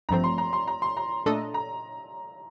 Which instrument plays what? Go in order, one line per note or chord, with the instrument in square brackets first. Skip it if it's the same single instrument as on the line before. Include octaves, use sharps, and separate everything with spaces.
[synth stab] A1 G2 F3 A3 C4 [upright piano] A#5
[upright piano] C6
A#5
C6
A#5
C6
A#5
[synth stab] A#2 A3 D4 A4 D#5
[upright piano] A#5